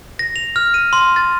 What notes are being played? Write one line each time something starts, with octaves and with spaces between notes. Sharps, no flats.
A#6
F7
F6
D#7
C6
A6